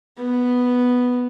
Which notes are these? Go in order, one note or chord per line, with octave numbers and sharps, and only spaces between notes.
B3